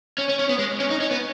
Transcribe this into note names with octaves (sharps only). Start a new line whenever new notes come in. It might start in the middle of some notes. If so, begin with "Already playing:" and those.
C#4
C#4
C#4
B3
G#3
C#4
D#4
C#4
B3